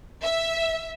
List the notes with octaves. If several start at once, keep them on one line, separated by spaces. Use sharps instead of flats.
E5